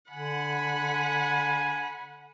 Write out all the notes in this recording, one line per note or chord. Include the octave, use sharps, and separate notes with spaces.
D3 F#5 G#5 B5